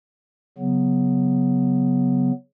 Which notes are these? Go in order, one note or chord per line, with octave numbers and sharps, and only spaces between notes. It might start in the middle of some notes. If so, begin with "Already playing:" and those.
C#3 F#3 B3